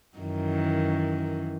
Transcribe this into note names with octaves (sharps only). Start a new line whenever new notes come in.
F#2 D#3 E3